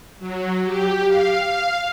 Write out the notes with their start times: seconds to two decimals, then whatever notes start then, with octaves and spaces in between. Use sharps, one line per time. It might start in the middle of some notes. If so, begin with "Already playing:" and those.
0.19 F#3
0.65 G4
1.07 F5
1.40 F5